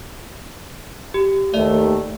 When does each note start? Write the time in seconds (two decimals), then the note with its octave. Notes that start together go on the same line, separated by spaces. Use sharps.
1.14 G4
1.54 D#2 A3 D5 E5